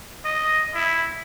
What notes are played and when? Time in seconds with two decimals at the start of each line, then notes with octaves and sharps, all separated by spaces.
0.25 D#5
0.75 E4